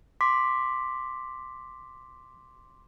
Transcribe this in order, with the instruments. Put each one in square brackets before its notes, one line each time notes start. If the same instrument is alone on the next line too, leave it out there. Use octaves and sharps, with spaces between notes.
[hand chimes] C6 D6 B6